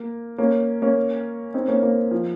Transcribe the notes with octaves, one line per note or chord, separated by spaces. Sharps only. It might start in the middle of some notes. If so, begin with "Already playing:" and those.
Already playing: A#3
A#3 C#4
A#3 C#4
C4 D#4
A#3 C#4
A#3 C#4
F3